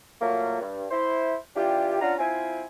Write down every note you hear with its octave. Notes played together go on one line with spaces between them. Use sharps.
A#2 F#3 A3 A#3
G2
E4 C5
E3 D4 F4 G4
C#4 D4 F4 F5 F#5 A#5
C4 E4 F4 G#5